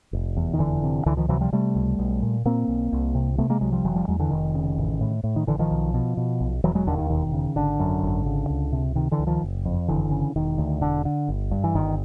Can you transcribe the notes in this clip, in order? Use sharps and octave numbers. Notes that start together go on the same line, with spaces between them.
F1
E2
D#3
F1 D3 E3
C3
C#2 D3 E3
D#3 F3
C3 E3 F#3
F3 G3
C3 G3 A3
C#2
B1
A#2
A#2 A#3 C4
B1
C2
C3
C3 A3 B3
G#3 A#3
C2 F#3 G#3
F3 G3
F1 E3 F#3
F3 G3
E2 F#3 G#3
D3 E3
F1 D#3
C#3
A1
A2
A2
D#3
A1 D3 E3
D#3 F3
B1
B2
B2
B1
E1 E3 F#3
F#3 G#3
D#2 D3
D#3
E1 D#3
C#3
G#1 D3
F#2
G#1
C#3
C#2
C3
C3 D#3
D3 E3
C#2
D#3 F3
F#1
F2
F#1 D3 E3
C#3
E1 D#3
D2
E1 D3
D3
G1
G2
E3
G1 D#3